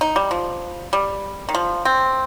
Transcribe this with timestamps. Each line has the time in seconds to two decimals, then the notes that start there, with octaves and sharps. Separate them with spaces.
0.01 D#4
0.16 G3
0.31 F3
0.93 G3
1.49 D#3
1.55 F3
1.85 C4